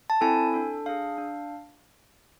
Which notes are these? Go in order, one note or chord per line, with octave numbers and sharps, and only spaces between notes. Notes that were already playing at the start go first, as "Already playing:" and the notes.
A5
C4 E4 A4 G#5
D4 A4
D4 G#4 F5
D4